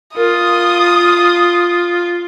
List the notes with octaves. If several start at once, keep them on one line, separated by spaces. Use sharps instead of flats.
F4 A#4 D#6